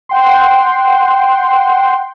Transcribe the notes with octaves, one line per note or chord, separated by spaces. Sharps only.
F#5 G5 C6